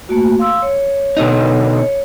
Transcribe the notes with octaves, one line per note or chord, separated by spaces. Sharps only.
A3 A#3 F#4
F5 C6 E6
C#5
B2 D3 D#4
C#5